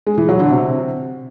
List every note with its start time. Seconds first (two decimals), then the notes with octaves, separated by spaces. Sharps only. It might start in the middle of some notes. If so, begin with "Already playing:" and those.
0.07 G#3
0.18 E3
0.29 F#3
0.40 D3
0.51 C3